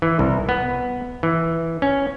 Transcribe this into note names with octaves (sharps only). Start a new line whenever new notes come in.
E3
C2
B3
E3
C#4